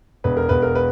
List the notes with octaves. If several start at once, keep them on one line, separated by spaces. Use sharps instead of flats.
E1 B4
A#4
E1 B4
A#4
B4